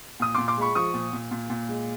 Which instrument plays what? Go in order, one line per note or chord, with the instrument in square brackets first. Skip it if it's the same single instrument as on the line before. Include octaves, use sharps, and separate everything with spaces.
[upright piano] A#2 D#6
A#2 C6 D6
C6 D6
G#3 B5 C#6
F3 C#6 D#6
A#2
A#2
A#2
A#2
G#3